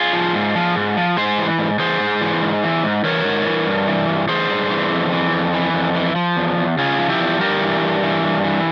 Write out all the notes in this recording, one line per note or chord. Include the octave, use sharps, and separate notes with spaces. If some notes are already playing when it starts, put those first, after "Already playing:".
Already playing: F4 G#4
F3
G#2
F3
G#2
F3
G#2 G#4 C5
E3
G#2
E3 G#4 C5
G#2
E3
G#2
E3
G#2
E3 A#4 C#5
G#2
E3
G2
E3
G2
E3 G#4 C5
G2
E3
F2
E3
F2
E3
F2
E3
F3
E2
E2
C#3 F4 G#4
F3
E4 G4
E2
G2 G4 A#4
E3
G2
E3
G2
E3